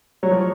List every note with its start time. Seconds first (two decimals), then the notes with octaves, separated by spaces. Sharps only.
0.23 F#3 C#5
0.31 F3